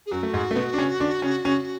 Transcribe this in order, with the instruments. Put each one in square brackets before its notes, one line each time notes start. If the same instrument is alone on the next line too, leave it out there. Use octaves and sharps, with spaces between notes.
[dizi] G#4
[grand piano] F#2 F#3 [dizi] F#4
[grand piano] A3
G#2 G#3
A3
B2 B3
D4
C#3 C#4
D3 D4
C#3 C#4
C#3 C#4